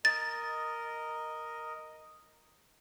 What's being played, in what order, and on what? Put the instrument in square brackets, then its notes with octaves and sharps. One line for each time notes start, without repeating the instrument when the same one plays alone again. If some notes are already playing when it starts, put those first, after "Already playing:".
[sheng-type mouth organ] A#4 D#5 [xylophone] A6